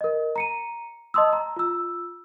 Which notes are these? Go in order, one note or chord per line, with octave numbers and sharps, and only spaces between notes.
A#4 D#5
A#5 C#7 D#7
D#5 A5 C6 D#6 E6
A#5
F4 E6